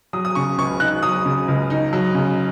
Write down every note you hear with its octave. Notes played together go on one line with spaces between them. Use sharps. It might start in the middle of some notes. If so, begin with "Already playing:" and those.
F#3 D#6
D#6
C#3 C#6
C#2 C#6
D#4 F#6
F#3 D#6
C#3
C#2
D#4
F#3
C#3